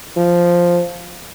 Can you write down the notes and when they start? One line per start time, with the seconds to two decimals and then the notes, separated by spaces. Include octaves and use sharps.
0.17 F3